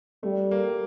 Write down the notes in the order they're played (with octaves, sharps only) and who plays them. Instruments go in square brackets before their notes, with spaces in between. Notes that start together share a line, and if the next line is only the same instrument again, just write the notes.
[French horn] G3 [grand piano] A3
[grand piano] A#3